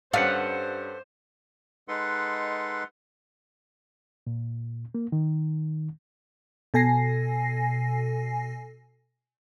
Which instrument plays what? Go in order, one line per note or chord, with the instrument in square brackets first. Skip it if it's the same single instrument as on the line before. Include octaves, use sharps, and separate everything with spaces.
[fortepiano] G2 G3 C#4 [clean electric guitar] A4 B4 F#5 [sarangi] C5 [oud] F5
[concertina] G#3 D#4 A4 B4 F#5 C6
[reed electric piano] A#2
A#3
D#3
[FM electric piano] B2 A4 G#5 A#6 C7